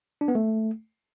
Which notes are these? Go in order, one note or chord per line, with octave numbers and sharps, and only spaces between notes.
D4
B3
A3